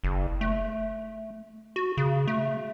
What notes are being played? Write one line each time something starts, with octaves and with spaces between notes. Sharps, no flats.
F#1
A3
F#4
C#3
A3